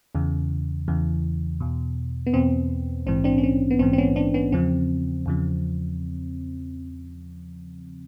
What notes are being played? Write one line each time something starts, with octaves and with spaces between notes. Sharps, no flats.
E2 C#3 E3
E2 C#3 E3
E2 B2
B3
E2 B2 C4
A#1 G#2 E3 C4
C4 D4
C#4
C4
B3
A#1 G#2 E3 C4
C4
B3 C#4
C4 D4
B3 C#4
E2 C#3 F3 C4
E2 C#3 F3